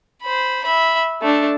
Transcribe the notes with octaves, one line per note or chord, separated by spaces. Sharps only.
C5 B5
E5 B5
A3 D4